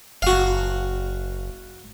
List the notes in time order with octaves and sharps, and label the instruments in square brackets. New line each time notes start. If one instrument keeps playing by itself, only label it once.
[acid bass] F#1 [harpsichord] F#4 F5